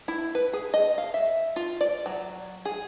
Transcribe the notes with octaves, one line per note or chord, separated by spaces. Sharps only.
E4
B4
G#4
D#5
F5
E5
F4
D5
F#3
G#4